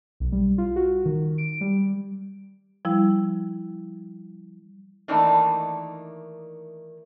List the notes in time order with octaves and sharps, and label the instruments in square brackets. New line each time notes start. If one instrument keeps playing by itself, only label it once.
[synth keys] B1
G3
F4
F#4
D#3
D7
G3
[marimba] F3 G3 E4
[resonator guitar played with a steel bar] D#3 E3 A3 A#3 D4 D#4